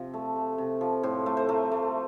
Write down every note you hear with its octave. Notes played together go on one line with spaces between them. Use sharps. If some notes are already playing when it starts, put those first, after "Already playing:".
Already playing: C3 F3
A3
A3
C3
F3
A2 C5
A3
C5
A3 A#4
A3